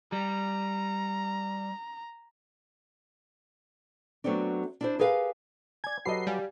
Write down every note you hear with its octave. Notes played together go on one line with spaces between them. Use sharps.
G3 A#5
F#3 A3 B3 C4 D4
D4 E4 C5
G4 G#4 A#4 B4 F5
D5 G#5 G#6
F#3 G4 A4 B4 D#5 F#5 C7
G3 F5 G#5